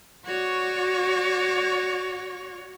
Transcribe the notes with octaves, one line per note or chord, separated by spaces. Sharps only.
F#4 C#5 D5 C#6